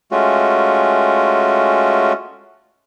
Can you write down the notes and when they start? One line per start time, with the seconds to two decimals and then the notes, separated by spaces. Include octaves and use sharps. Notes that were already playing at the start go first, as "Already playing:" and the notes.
0.11 G#3 A3 C#4 F4 F#4